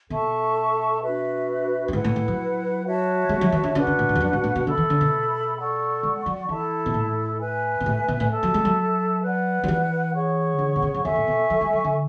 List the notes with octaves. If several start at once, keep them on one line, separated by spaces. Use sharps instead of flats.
B2 A4 E5 A5 C#6
D4 F#4 B4 E5
F#2
G#2 E4 B4 F#5
A2
A2
F#3
F#4 C#5 E5 A5
G#3
F#3
E3
D3
C#3 D4 F#4 B4 F#5
C#3
A2
G#2
E2
F#2
G#2
A2
B2
D3 A4 E5 B5
E3
D3
B2
A4 D5 F#5 C#6
G#3
F#3
E3 E4 A4 E5 A5
B2
A2
B4 E5 G#5
B2
A2
B2
A2
A4 E5 A5
F#3
G#3
F#3
B4 D5 F#5
F#3
E3
G#4 C#5 F#5 C#6
D3
B2
C#3
F#2
E2 A4 E5 G#5 C#6
A2
B2
F#3
G#3
F#3
D3